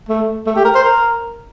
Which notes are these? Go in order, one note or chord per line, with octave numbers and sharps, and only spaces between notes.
A3
A3
G4
A#4
C5
A#4